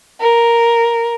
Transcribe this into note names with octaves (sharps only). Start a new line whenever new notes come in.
A#4